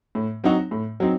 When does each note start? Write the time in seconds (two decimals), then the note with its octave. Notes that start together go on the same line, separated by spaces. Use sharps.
0.15 A2
0.44 F#3 C4 D#4 F#4
0.71 A2
1.00 F#3 C4 D#4